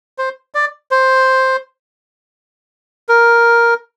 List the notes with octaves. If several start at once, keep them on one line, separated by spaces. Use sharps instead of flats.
C5
D5
C5
A#4